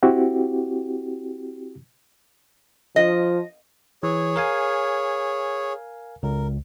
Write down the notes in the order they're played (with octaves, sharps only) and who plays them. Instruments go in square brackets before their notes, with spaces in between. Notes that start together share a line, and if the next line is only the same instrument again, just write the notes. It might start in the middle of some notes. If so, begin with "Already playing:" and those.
[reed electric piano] C4 E4 F#4 G4
[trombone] F3 [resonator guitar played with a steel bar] D#5
[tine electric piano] E3 [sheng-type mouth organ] G#4 C#5
[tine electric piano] A#4 F5 G#5
[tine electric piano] C#2 [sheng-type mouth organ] A#4